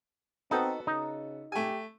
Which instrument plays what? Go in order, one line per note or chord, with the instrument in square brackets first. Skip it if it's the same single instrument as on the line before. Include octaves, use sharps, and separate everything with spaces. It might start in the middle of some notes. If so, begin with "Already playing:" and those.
[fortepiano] B3 F#4 A4 [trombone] C4 [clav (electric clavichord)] D#4
[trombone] C#3 [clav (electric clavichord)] D#4
[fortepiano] A3 G#5 [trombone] G4